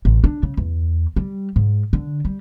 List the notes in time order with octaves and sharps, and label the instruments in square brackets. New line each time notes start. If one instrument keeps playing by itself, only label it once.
[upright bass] A1
D4
C#3
E2
G3
G#2
D3
G3